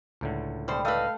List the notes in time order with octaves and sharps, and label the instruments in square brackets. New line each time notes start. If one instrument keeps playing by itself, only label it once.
[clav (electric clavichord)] C#2 A2 D3
[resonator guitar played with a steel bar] B2 C5 [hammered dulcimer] G3
[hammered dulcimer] A3 [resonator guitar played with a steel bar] B4 D#5 [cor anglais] F5